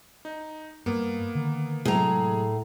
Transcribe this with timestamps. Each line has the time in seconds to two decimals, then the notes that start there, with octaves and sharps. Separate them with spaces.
0.25 D#4
0.86 G2 A#3 B3
1.35 D3 D#3
1.85 A2 C3 F#3 G#3 G#4 A#5